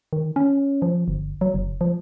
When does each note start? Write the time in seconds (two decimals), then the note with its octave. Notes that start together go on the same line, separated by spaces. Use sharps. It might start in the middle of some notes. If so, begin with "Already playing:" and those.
0.13 D#3
0.36 C#4
0.82 F3
1.08 G1
1.41 F#3
1.54 F#1
1.81 F3